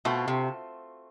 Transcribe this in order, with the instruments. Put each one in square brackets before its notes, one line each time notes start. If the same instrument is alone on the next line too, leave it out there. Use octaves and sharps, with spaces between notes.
[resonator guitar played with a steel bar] B2 [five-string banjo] A3 C4 F4
[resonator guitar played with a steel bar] C3